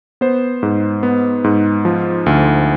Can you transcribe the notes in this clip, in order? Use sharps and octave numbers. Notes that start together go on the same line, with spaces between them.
B3 C5
G#2
B3
G#2
F3
D2